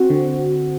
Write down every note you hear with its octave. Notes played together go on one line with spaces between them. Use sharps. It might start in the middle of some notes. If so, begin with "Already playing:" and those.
Already playing: C4 F#4
D3